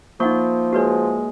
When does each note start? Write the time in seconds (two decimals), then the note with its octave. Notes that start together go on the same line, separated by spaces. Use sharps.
0.20 F3 A#3 D#4 F#5 C#6
0.73 G#3 F#4 B4 C#5